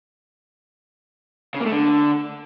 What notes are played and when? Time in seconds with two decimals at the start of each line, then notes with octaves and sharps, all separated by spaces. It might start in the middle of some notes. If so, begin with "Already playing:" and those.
1.54 C#3
1.60 A#3
1.66 A3
1.72 D3